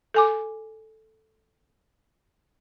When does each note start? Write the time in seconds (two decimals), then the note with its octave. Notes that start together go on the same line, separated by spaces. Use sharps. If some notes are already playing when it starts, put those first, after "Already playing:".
0.14 A4 G#5 D6